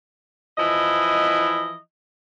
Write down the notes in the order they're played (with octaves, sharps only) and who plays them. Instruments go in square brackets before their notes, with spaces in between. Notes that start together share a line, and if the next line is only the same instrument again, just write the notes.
[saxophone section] E3 F3 E4 D#5